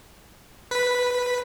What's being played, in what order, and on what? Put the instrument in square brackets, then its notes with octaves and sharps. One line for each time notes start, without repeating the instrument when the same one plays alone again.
[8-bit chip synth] B4 B6